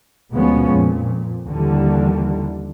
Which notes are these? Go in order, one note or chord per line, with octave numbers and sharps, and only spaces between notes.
D2 B2 F3 G#3 B3 C#4
F2 A#2
D#2 D3 E3 G3